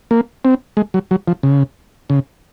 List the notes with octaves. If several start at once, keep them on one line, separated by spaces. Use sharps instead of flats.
A#3
C4
G#3
F#3
F#3
F3
C#3
C#3